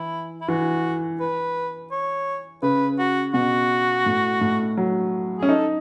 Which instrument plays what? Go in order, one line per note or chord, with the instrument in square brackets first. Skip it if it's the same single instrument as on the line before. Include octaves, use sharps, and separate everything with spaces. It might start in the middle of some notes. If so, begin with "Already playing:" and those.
Already playing: [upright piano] E3 [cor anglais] E4
[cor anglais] E4
[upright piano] E3 [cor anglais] F#4
[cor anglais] B4
C#5
[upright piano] C#3 [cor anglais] B4
[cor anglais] F#4
[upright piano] B2 [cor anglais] F#4
[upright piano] A2
A2
F#3
[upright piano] C#4 [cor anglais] G#4
[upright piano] D#4 [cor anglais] A4